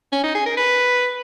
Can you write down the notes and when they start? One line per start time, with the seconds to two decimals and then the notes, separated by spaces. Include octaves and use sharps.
0.12 C#4
0.24 D#4
0.35 G#4
0.46 A#4
0.57 B4